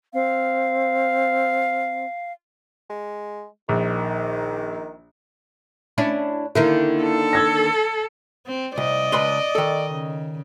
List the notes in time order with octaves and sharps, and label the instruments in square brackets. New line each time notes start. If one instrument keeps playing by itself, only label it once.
[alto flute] C4 [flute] F5
[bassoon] G#3
[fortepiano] A#1 [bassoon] D#3
[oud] C#4 D4 E4
[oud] D3 D#3 A#3 [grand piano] E4
[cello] A4
[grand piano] E6 G#6 A#6
[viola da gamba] C4
[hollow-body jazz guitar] C2 [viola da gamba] D5 D#5
[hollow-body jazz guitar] C#2 B4 C6
D#3 A4
[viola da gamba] C#3